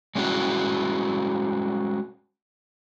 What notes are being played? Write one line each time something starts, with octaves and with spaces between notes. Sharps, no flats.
G3 G#3 C#4 E4 F#4